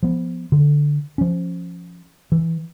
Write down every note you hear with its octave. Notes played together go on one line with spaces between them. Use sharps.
F3 B3
D3
F3 C#4
E3